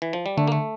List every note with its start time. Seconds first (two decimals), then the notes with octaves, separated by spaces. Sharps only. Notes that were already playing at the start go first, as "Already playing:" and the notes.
0.02 E3
0.13 F3
0.26 G3
0.37 D3 A3
0.48 A#3
0.52 A3